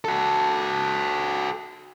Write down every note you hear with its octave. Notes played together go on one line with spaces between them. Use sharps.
F#4 A4